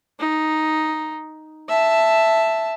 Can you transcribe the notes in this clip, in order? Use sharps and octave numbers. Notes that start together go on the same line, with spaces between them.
D#4
E5 A5